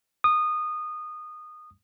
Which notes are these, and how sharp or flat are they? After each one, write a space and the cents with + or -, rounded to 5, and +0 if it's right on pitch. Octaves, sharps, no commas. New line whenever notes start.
D#6 -20